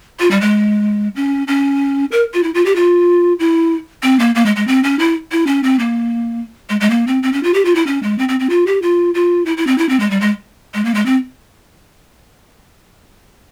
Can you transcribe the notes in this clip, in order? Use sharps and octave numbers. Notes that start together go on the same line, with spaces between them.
F4
G3
G#3
C#4
C#4
A#4
F4
E4
F4
G4
F4
E4
C4
A#3
A#3
G#3
G#3
C4
C#4
E4
E4
C#4
C4
A#3
G#3
G#3
A#3
C4
C4
C#4
F4
G4
F4
E4
C#4
G#3
C4
C4
C4
F4
G4
F4
F4
E4
E4
C4
E4
C4
G#3
G3
G#3
G#3
A#3
G#3
C4